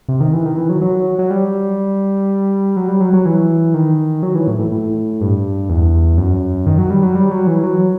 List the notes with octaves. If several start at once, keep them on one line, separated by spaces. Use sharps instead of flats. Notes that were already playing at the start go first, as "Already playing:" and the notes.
C3
D#3
E3
D#3
E3
F#3
F#3
F#3
G3
F#3
G3
F#3
F#3
E3
D#3
F#3
E3
A2
A2
A2
G2
E2
F#2
D#3
F#3
G3
F#3
G3
F#3
E3
F#3